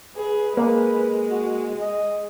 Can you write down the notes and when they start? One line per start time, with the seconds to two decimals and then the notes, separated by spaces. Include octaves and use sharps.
0.17 G#4 B4
0.57 G#3 A#3
1.31 F#4
1.80 D#5